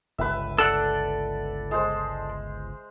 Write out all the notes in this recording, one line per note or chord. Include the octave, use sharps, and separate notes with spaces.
G1 C#2 G2 B4 E5
A4 D5 F#5 E6
G#3 C5